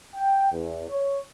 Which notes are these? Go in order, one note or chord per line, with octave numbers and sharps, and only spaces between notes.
G5
E2
C#5